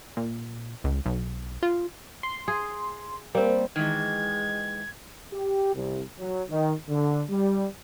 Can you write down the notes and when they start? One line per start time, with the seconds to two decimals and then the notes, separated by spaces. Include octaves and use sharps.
0.17 A#2
0.84 C#2
1.06 B1
1.63 F4
2.23 C6
2.48 G#4
3.35 G3 A#3 C4
3.76 D#3 E3 G#3 G#6
5.33 G4
5.75 C2
6.19 F#3
6.50 D#3
6.89 D3
7.30 G3